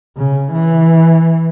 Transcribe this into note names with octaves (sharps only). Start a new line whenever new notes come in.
C#3
E3